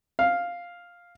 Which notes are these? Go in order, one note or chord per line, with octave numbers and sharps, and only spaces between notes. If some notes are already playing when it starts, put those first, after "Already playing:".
F5